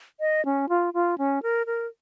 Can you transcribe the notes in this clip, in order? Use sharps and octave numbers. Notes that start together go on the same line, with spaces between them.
D#5
C#4
F4
F4
C#4
A#4
A#4